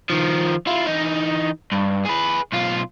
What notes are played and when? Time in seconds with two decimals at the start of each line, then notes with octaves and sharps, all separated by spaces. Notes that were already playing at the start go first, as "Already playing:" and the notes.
0.10 D#3 F3
0.67 E4 F4
0.87 E3 D#4
1.72 G2
2.06 G#4 B4
2.52 B1 F4